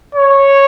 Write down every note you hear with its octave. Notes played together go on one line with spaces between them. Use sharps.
C#5